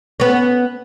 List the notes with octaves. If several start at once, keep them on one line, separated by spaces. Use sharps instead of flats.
B3 C#4